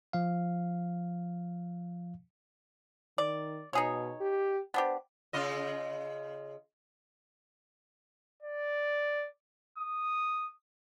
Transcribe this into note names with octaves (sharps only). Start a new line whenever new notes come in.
F3 F5
D#3 D5
B2 D#4 G#4 C#5
G4
B3 D4 G4 C5
C#3 F4 D#5
D5
D#6